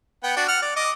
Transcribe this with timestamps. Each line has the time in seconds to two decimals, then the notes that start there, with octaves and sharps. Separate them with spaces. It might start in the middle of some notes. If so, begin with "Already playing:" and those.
0.23 B3 F#5 G5
0.37 D4 F#4
0.48 F#5 F6
0.62 D5
0.76 D#5 D6